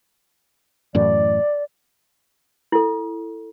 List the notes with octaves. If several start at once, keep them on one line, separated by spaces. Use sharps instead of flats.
F#2 A2 E3 D5
E4 A4